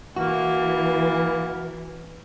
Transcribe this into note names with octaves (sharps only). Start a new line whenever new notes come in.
E3 A#3 F#4